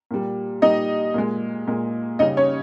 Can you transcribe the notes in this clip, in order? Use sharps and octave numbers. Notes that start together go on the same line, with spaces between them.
A#2 G3
A#2 G3 D#4 D#5
A#2 G#3
A#2 G#3
C#3 G3 D#4 D#5
C#4 C#5